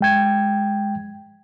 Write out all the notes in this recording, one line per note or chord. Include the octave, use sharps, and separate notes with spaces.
G#3 G5 G#6